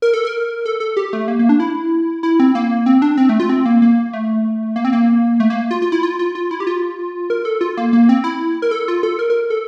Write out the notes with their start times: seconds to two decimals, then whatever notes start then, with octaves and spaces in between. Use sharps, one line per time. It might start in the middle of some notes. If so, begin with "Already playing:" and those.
0.02 A#4
0.14 A4
0.25 A#4
0.66 A4
0.80 A4
0.97 G4
1.13 A3
1.28 A#3
1.39 A#3
1.49 D4
1.60 E4
2.23 E4
2.40 C4
2.55 A#3
2.86 C4
3.02 D4
3.17 C4
3.29 A3
3.40 F4
3.50 C4
3.66 A#3
3.82 A#3
4.13 A3
4.76 A#3
4.85 C4
4.93 A#3
5.40 A3
5.50 A#3
5.71 F4
5.82 F4
5.92 E4
6.03 F4
6.19 F4
6.35 F4
6.51 E4
6.60 G4
6.67 F4
7.30 A#4
7.45 A4
7.61 F4
7.77 A#3
7.93 A#3
8.09 C4
8.24 E4
8.62 A#4
8.71 A4
8.88 F4
9.03 A4
9.19 A#4
9.30 A#4
9.50 A4